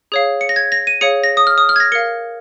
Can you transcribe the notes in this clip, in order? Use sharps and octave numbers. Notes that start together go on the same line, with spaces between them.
G#4 C#5 F5
C#7
A#6
G#6
A#6
D#7
G#4 C#5 F5 C#7
A#6
D#6
F6
D#6
F6
G#6
A#6
A#4 F5 C#7